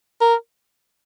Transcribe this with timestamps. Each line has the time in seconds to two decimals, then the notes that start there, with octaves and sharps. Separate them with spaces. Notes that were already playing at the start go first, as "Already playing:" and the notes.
0.21 A#4